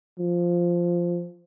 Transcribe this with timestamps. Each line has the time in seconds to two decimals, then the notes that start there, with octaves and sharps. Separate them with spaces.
0.19 F3